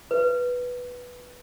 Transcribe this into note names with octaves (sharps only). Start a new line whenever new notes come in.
B4